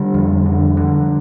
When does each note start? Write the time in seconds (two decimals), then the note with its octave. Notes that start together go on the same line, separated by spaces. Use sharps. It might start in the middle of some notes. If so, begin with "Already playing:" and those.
Already playing: D3 G3
0.14 F2
0.46 D3
0.77 D3